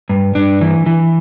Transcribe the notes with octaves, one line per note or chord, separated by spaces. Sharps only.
G2
G2 D4
E3
E3